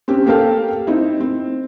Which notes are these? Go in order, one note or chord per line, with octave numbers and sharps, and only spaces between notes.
C4 C#4 G4
A#3 G4 A4 A#4 F5 G5
C4 D#4 E4
C4